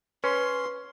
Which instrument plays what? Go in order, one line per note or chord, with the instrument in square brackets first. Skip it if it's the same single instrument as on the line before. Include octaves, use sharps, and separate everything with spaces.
[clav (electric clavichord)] C#4 [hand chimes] B4 [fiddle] C6